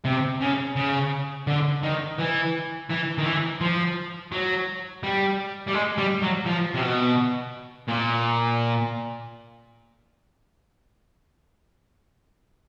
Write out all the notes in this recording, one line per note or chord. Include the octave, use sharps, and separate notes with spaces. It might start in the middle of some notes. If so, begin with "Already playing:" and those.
C3
C#3
C#3
D3
D#3
E3
E3
D#3
E3
F3
F#3
G3
G3
G#3
G3
F#3
F3
C3
B2
A#2